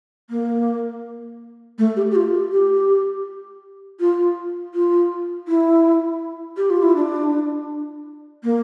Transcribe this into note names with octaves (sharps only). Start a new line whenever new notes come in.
A#3
A3
G4
G4
F4
G4
G4
F4
F4
E4
G4
F4
E4
D4
A#3